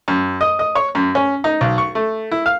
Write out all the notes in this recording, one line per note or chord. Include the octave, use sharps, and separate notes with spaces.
F#2
D#5
D#5
C#5
F#2
C#4
D#4
B1
C#6
A3
E4
F5